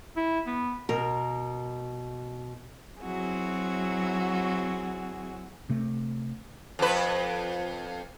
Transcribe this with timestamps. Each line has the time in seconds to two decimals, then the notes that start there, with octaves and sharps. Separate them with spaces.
0.16 E4
0.47 B3
0.89 B2 A#4
3.02 F#3 C4 E4 F#4 G#4
5.69 C3 A3
6.79 F2 B4